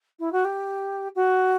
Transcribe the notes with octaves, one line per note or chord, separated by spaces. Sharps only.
E4
F#4
G4
F#4